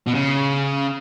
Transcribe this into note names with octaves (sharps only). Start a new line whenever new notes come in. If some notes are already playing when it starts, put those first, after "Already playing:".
B2
C#3